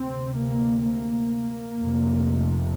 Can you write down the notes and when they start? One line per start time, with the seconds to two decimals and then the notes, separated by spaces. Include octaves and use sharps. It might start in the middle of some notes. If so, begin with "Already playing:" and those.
Already playing: D2 C3 C4
0.37 A#3
0.84 A#3
1.77 F1 F2 C3